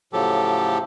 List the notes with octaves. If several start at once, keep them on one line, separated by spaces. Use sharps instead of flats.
A2 C#3 F3 F#3 G4 A4